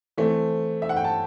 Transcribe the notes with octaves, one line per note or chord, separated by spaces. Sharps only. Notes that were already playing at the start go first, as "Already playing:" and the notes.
E3 A3 C4
E5
F#5
G5
A5